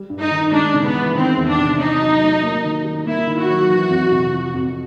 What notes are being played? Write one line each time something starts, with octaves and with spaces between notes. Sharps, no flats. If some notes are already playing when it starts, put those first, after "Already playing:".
Already playing: G3
G2
D#4
D#3
G#3 D4
C#3
B3
E3
D#3 C4
E2
D4
C3
C#4 D#4
F#3
A3
A#3
D#3
G3
A#3 E4
D#3
F#4
F#3
E3
F2
C3
F3
F2